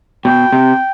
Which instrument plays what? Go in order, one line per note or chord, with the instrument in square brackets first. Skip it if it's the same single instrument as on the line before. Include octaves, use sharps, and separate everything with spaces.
[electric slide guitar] B2 [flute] G5
[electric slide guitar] C3